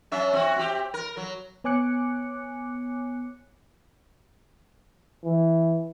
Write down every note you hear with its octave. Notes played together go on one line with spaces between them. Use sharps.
F#3 C#4 E5
C4 F#4
C4 G4
A#4
F#3
B3 C#5 G#5 D6 F#6 C#7
E3